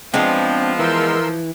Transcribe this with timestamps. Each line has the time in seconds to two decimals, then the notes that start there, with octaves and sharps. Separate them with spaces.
0.14 F3 G#3 B3 C4 D4
0.79 E3 A#4 C6 E6